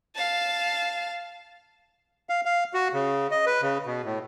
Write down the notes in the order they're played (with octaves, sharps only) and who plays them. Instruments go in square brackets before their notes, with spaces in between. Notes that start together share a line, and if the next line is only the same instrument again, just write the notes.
[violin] F5 A5
[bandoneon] F5
F5
F#4
C#3
D#5
B4
C#3
B2
A2